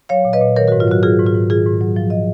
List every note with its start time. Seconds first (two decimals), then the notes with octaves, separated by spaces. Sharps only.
0.09 F#3 C#5 F5
0.25 A#2
0.33 B4 D#5
0.41 A#2
0.56 D#3 A#4 C#5
0.68 G#2 F#4 A#4
0.80 F4
0.87 F#3 F#4
1.03 F#3 F4 G#4
1.19 G#2
1.27 F4
1.34 G#2
1.50 D#3 F4 G#4
1.66 G#2
1.81 F#3
1.96 F3
2.10 D#5